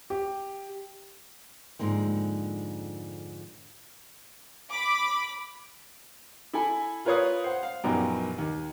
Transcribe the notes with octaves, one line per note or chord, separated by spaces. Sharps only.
G4
F2 G#2 D3 A#3 C4
B5 D6
E4 A4 G#5 B5
F4 A#4 B4 C#5 F5 D#6
C5 F#5
F5
A#1 F#2 B3 D#4 G4 A#5
D#2